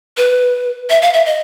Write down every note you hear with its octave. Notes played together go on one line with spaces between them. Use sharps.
B4
E5
F5
E5
D#5